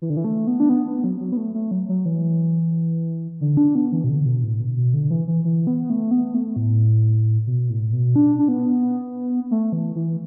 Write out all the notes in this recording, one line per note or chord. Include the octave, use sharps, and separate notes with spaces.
E3
D3
E3
A3
B3
D4
B3
B3
F#3
F#3
B3
A3
A3
F#3
F#3
E3
D3
D4
B3
E3
B2
D3
B2
A2
B2
B2
D3
E3
E3
E3
B3
A3
B3
A3
A2
B2
A2
B2
D4
D4
B3
A3
E3
E3